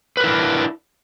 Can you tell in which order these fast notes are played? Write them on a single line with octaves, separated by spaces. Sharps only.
B4 A#4 E4 D4